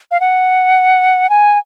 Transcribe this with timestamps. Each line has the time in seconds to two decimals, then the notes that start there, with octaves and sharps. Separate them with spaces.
0.11 F5
0.20 F#5
1.29 G#5